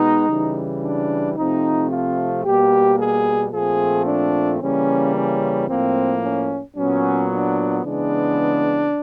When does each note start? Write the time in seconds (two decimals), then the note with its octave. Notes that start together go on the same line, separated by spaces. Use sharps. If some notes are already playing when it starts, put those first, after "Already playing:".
Already playing: B2 G#3 B3 D#4
0.28 C#3 E3 G3
0.82 D4
1.36 C3 F3 A3 C4 D#4
1.91 F4
2.44 B2 G3 A#3 G4
2.98 G#4
3.52 A#2 F3 A3 C4 G#4
4.06 D4
4.60 C#3 E3 G3 A#3 C#4
5.14 C#4
5.68 A2 F3 A#3 C4
6.22 C#4
6.76 A#2 F#3 B3 C#4
7.30 D4
7.84 C#3 E3 G#3 B3 D4